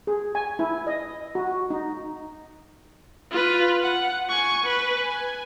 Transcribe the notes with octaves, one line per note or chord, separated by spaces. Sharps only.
G#4
G#5
E4
D#5
F#4
D#4
F4 B4
F#5
G#5 C#6
B4
G#5